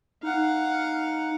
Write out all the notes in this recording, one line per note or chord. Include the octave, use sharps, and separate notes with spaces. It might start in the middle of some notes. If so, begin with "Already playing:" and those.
D#4 F5 F#5